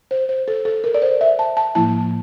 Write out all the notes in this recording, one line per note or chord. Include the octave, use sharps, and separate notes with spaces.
C5
C5
A4
A4
A#4
D5
C5
E5
A5
A5
A2 F3 A#3 E4 A5